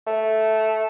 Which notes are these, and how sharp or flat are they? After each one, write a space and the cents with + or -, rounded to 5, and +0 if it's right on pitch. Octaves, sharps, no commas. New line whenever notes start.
A3 -5